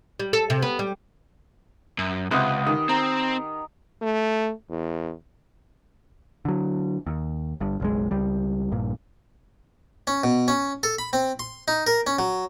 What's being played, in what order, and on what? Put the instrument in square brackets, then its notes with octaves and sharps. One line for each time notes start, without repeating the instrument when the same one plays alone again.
[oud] G3
A4
C3
B3
G3
[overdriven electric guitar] F#2
[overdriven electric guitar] C#2 [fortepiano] C3 [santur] B4 D#5 F#5
[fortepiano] D#3 [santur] G4 D#5
[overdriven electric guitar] C4 [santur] A#5
[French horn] A3
E2
[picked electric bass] D3 F#3
D#2
G1 G2
F#1 B1 G#3
C#2 G3
A#1 G2 A#2
[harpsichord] C#4
B2
C#4
A4
B5
C4
C6
D#4
A#4
C#4
F#3